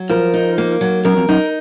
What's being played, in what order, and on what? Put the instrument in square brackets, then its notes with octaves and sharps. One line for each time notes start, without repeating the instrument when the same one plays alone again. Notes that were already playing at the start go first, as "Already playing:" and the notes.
Already playing: [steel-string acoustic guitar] F#3
[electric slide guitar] F3 [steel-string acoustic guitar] A#4
[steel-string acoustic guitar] D#4
A#3
F#3
[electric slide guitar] F#2 [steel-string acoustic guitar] A#4
[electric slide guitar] F2
[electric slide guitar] F#2 [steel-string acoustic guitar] D#4